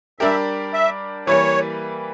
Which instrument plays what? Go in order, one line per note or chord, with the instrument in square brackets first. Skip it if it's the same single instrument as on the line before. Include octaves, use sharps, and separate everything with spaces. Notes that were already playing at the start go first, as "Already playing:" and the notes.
[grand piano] G3 D4 G4 A#4 [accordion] E5
[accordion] E5
[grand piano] E3 G3 A#3 [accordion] C#5